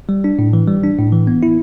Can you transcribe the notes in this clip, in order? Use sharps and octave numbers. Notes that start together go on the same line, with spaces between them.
G3
D4
A2
E3
G3
D4
A2
E3
B3
E4